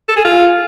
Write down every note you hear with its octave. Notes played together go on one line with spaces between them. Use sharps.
A4
G#4
F4